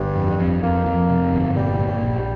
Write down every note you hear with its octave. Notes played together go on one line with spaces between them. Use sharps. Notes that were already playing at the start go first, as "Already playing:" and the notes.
Already playing: G1 G2
F2
F2
F2 A#3
F2
C3
G1
A#2 G3
A#2
G3
A#1
G3